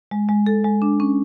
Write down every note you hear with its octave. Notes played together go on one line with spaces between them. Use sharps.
G#3
G#3
A4
G#3
D4
C#4